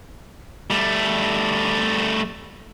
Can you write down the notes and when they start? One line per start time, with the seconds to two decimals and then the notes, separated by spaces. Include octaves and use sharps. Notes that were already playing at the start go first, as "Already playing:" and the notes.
0.70 G3 A3